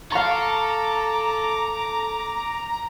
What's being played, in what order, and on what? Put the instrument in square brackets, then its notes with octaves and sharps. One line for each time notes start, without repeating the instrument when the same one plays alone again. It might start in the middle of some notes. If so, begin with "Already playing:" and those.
[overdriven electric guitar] A4 [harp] F5 C#6 [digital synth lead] A#5 [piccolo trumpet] D6